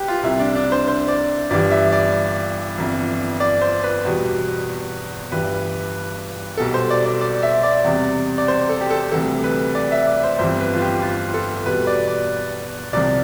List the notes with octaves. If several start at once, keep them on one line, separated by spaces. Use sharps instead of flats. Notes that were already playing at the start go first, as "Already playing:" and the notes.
Already playing: G4 B4
F4
C2 C3 G3 E4
D4
D4
C5
C5
D5
G1 G2 E3 G3 D5
E5
D5
G1 F2 E3
D5
C5
B4
E2 B2 G3
G1 G2 E3 G3 B4
B1 B2 G3 A4
C5
D5
D5
D5
E5
D5
E2 C3 G3
D5
C5
A4
G4
A4
D2 C3 E3 G3 A4
B4
D5
E5
D5
C5
G1 F2 E3 G3 C5
B4
F4
G4
F4
A4
E2 B2 G3 B4
D5
D5
C2 C3 F3 D5